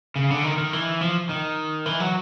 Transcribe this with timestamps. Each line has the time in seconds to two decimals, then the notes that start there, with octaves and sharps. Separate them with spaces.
0.16 C#3
0.30 D3
0.43 D#3
0.58 D#3
0.73 E3
1.01 F3
1.29 D#3
1.86 E3
2.00 F#3